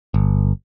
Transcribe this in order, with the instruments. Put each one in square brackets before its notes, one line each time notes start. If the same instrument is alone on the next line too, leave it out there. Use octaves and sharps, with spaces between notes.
[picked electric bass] G1